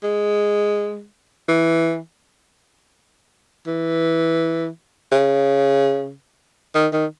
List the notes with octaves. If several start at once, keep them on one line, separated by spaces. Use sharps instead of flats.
G#3
E3
E3
C#3
D#3
D#3